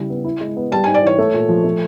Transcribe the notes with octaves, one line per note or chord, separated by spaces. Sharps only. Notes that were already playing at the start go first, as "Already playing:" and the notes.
Already playing: C#3 G3 E4
B3
E4
G#3
B3
G3 A5
G#2 G#5
D5
E3 C#5
A3
A#2
F3
A3